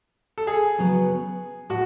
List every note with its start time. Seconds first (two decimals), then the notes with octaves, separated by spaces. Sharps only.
0.38 A4
0.47 G#4
0.78 C#3 F#3 B3
1.69 A2 F#4